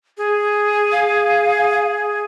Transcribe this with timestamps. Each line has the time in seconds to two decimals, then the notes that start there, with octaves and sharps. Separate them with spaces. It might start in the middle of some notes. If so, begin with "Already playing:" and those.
0.18 G#4
0.92 F5